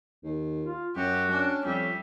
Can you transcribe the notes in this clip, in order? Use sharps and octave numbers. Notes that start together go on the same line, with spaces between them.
D#2
F4
F#2 F#3 F#4 G4
C#4 D4
F2 G3 E5